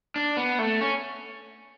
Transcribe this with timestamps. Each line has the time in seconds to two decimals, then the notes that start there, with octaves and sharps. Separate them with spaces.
0.16 D4
0.37 B3
0.59 A3
0.81 C#4